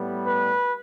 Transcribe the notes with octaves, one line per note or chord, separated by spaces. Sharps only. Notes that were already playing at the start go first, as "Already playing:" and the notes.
Already playing: A2 G3 B3
B4